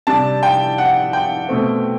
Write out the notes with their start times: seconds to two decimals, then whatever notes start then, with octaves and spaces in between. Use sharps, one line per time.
0.07 C3 G3 D4 A5
0.43 G5
0.78 F#5
1.13 G5
1.49 B2 A3 C4